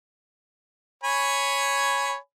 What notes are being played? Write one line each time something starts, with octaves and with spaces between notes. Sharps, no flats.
C#5 G#5 B5